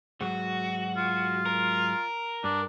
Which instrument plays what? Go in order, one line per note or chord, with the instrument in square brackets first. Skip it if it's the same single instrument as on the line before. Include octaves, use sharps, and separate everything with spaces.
[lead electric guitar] G#2 F#3 [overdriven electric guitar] F#4
[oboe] F4
[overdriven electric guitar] A#4
[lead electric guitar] G2 [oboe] D4